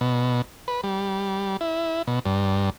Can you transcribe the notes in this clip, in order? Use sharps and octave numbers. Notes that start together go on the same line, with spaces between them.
B2
B4
G3
E4
B2
G2